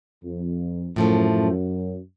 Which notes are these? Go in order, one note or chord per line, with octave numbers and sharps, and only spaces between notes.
F2
F#2 A2 F3 A3
F#2